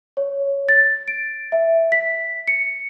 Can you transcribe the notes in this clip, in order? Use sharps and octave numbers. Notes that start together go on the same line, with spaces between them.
C#5
A6
D7
E5
B6
C#7